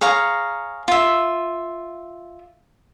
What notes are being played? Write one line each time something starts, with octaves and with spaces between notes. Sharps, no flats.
G#4 C#5 F5 A#5
F4 E5